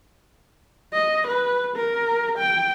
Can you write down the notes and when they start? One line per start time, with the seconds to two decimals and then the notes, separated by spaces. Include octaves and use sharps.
0.93 D#5
1.27 B4
1.76 A#4
2.38 G5